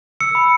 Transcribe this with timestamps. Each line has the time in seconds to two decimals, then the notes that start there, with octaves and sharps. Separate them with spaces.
0.21 E6 C#7
0.35 B5